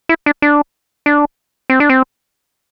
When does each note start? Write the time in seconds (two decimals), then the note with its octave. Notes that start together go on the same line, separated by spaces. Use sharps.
0.09 E4
0.26 D4
0.42 D4
1.06 D4
1.70 C4
1.80 D4
1.90 C4